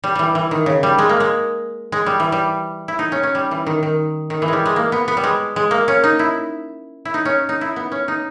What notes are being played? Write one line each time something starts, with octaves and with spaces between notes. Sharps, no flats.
G3
E3 G3
E3
D#3
C#3
G3
G#3
A#3
G#3
G#3
G3
E3
G3
E4
D#4
C#4
C#4
G3
E3
D#3
D#3
D#3
E3
G3 G#3
G#3
A#3
B3
B3
G3
G#3
G#3
A#3
C#4
D#4
E4
E4
D#4
C#4
D#4
E4
B3
C#4
D#4